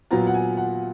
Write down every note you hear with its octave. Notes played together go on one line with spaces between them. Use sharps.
A#2 F#3 B3 F4 A#5
F#5
G#5
F#5